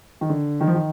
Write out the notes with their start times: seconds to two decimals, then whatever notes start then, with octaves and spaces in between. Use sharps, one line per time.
0.21 D#3
0.30 D3
0.61 D#3
0.67 F3
0.74 D#3